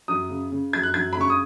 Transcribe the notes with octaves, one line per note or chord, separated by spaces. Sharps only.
F#2 D#6
C#3
C#3
F#2 G#6
F#6
F#2 G#6
B5
C#3 C#6
D#6